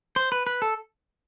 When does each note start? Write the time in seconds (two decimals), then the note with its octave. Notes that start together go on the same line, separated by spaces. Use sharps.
0.16 C5
0.32 B4
0.47 B4
0.62 A4